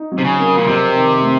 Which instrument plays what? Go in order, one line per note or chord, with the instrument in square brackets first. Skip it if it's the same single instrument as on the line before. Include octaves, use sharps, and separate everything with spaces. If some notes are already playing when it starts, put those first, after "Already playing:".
Already playing: [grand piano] D#4
F#3
[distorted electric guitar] C3
C#3
[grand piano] A#3
[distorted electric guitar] A#2
[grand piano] F2 [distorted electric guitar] C3
[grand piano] D#3
A3